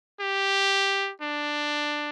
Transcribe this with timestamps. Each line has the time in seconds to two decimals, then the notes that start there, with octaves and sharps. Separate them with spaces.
0.20 G4
1.21 D4